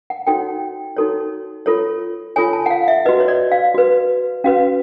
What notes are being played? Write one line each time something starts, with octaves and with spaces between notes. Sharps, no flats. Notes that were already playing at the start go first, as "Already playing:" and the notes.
F#5
D#4 F#4 A4 C#5 G5
D#4 F#4 A4 C#5
F4 A4 C#5
F4 A4 C#5 G#5
A5
F#5
F5
E5
F#4 B4 D#5
C#5
D5
F5
F#4 B4
C#4 F#4 B4 F5